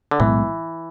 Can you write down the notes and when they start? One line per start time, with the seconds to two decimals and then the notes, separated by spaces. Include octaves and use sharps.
0.11 D3
0.20 B1 A2 E3 G#3 B3